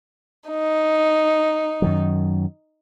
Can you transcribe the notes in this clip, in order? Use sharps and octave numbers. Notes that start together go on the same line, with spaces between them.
D#4
F#2 D#3 F#3